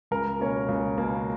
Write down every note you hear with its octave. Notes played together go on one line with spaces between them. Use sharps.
C#2 A#4
B2 A#3 C#4
C#2
B2 A#3 C#4